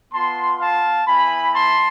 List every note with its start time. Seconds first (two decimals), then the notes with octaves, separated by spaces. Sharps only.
0.13 B3 F4 A5 C6
0.60 F5 A5
1.07 B3 E4 G#5 B5
1.54 A5 C6